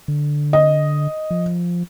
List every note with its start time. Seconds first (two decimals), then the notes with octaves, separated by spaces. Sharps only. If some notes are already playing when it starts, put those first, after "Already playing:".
0.08 D3
0.53 D#5
1.30 F3